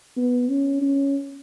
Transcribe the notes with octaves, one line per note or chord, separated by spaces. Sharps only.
B3
C#4
C#4